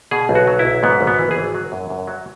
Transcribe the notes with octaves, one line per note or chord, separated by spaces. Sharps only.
B2 G#4
B1
F#4
F#3
E4
B1
G#2 B3
G#1
B3
E3
G#4
G#1
F#3
F#2
F#2
F#3